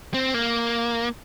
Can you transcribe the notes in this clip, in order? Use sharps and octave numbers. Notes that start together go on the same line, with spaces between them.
C4
A#3